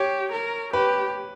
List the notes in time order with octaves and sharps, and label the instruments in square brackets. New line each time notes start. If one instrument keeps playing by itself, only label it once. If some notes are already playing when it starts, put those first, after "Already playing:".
Already playing: [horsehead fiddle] G4 [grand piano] C#5
[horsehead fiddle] A#4
[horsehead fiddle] G4 [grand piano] B4